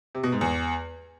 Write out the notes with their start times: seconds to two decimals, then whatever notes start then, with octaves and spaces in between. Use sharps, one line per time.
0.15 C3
0.23 B2
0.32 G#2
0.41 E2